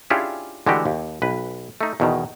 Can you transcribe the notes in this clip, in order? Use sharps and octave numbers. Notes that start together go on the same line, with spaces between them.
C#4 D4 E4 F4 G4 G#4
D3 E3 G#3 A3 F#4 G4
D#2
B1 B4
A3 D#4
E2 B2 D#3